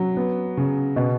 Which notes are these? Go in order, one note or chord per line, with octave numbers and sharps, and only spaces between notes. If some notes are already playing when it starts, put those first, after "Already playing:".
Already playing: F#3
B3
C#3
B2